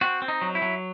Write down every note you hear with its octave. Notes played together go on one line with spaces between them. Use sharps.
C4 F#4
C4
D#4
F#3
E4
F#3